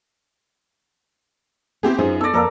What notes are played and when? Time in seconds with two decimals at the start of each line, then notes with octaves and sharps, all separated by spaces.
1.83 B3 C4 E4 G4 G#4
1.98 F#2 D#4 F4 G#4 C5
2.21 B3 A4 D5 E6 A#6
2.34 F2 A#3 A4 A#4 D5 F5